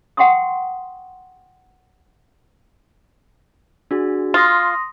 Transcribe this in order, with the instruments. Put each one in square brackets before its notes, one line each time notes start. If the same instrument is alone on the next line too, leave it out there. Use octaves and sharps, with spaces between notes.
[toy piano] F#5 G5 C6 C#6 D#6
[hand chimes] D4 F#4 G#4
[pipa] F4 [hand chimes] C6 D#6 A#6